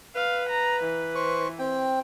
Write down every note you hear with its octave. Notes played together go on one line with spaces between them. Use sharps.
B4 F5
A#5
E3
C5 C#6
C4 G5